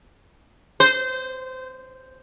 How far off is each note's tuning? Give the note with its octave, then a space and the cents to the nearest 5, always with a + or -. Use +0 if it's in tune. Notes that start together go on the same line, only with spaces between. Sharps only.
C5 -20